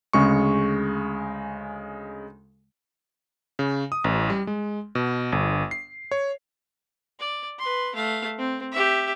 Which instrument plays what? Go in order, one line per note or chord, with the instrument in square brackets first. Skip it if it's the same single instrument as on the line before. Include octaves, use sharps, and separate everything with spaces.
[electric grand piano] D2 C#3 G#3 C#6
C#3
D#6
A1
G3
G#3
B2
G1
C7
C#5
[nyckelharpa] D5
B4 C6
A3 F5
C4
G4 E5